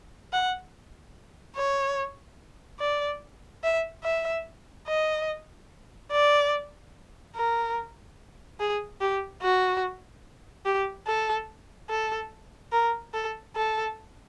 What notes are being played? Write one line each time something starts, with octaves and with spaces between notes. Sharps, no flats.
F#5
C#5
D5
E5
E5
D#5
D5
A#4
G#4
G4
F#4
G4
A4
A4
A#4
A4
A4